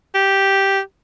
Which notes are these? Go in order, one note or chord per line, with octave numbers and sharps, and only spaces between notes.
G4